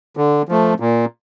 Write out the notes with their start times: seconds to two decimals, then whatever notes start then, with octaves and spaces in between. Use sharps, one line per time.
0.17 D3
0.49 F3 A3
0.80 A#2